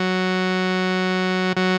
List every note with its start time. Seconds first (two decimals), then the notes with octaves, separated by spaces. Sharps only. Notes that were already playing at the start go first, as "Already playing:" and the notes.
Already playing: F#3
1.57 F#3